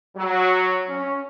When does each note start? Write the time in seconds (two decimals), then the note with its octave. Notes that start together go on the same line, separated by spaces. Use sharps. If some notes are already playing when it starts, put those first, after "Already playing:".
0.16 F#3
0.87 C#4